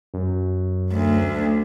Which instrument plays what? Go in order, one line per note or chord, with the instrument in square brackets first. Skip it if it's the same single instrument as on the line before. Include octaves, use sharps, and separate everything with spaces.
[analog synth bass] F#2
[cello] D2